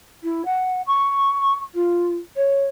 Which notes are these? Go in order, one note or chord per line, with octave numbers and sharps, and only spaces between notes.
E4
F#5
C#6
F4
C#5